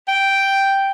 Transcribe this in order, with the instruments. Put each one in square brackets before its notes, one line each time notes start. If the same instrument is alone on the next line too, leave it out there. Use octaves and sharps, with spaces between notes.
[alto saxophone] G5